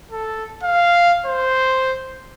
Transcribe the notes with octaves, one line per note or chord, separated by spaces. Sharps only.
A4
F5
C5